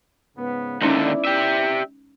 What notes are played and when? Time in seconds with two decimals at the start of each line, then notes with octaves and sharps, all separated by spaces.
0.37 G#2 C#3 B3
0.81 D#2 D3 G#3 B3 C#4 D#4 E4 D5
1.25 G4 E5